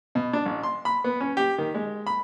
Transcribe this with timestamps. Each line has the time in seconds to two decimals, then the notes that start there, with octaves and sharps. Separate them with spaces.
0.15 B2
0.33 D4
0.46 A1
0.63 C6
0.85 B5
1.04 B3
1.21 C#4
1.37 G4
1.58 D#3
1.74 G#3
2.07 B5